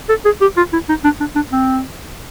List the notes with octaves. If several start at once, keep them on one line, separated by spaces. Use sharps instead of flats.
A4
G#4
G4
F4
E4
D#4
D4
D4
D4
C4